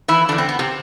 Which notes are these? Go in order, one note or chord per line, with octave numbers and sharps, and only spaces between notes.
E3 E4
E2 D3 F3 D4
C4
B3
C3 C4